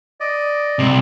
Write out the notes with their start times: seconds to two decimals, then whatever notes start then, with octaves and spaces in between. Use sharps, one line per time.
0.20 D5 D#5
0.79 C2 C3